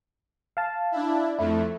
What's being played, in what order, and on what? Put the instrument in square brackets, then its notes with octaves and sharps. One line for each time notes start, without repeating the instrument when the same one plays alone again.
[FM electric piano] F5 A5
[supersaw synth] D4 E4
[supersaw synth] F2 A3 [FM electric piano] E4